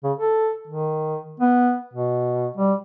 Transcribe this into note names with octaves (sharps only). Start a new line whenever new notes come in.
C#3
A4
D#3
B3
B2
G3